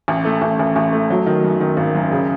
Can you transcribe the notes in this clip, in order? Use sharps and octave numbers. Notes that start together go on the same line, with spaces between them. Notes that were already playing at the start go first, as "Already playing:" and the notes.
A1
A3
A1
A1
A1
A3
F#3
D#3
F#2
D#3
G#1
F#2
C#3